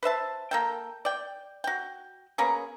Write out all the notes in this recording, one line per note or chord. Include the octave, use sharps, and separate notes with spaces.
B4 C5 E5 A5
A#3 A4 G5
D5 G5
F#4 G5
A#3 B3 C#4 G#4